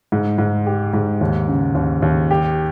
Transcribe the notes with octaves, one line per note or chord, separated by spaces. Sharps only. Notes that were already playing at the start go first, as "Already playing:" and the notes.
G#2
G#2
G4
G#2
D#2
C#3
D#2
D#2
G4